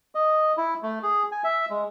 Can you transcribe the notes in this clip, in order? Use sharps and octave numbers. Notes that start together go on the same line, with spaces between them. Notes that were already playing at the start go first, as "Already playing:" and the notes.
D#5
E4
A3
G#4
G#5
E5
G#3